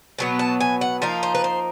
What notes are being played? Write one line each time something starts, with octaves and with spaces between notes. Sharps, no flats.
B2 F#3 B3
A5
G#5
F#5
F3 A#3 D#4 F5
C5
B4
C5